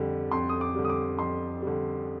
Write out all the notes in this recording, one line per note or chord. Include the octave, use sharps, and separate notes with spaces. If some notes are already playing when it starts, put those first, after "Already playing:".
Already playing: F2 D3 G3
F2 C6
D#6
D6
D3 G3
D#6
D6
F2 C6
D3 G3